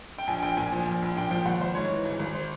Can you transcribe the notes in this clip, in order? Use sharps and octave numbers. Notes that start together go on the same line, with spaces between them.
G5
A#1 G#5
A#1 G5
A#2 G#5
F3
A#1
A#1
A#2 G5
F3 G5
G#1 F#5
G#1 C5
G#2 C#5
E3
G#1
G#1
C5